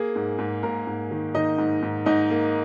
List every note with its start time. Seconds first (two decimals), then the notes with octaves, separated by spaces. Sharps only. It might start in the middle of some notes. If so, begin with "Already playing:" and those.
Already playing: A#3 G#4
0.15 G#2
0.38 G#2
0.63 G#2 A#3 A#4
0.87 G#2
1.11 D#3
1.34 D#3 D#4 D#5
1.58 G#2
1.82 G#2
2.06 G#2 D#4 D#5
2.30 A#3